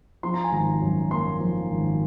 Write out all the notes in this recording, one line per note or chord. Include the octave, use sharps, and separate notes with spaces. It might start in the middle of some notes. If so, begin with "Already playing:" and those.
F3 C6
A#5
G#5
G#1 A#5
F#2
A#3 C6
F3
G#1